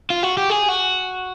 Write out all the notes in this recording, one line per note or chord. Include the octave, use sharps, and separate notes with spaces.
F4
F#4
G4
G#4
F#4